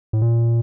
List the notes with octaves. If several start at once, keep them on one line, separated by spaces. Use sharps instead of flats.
A2
A#2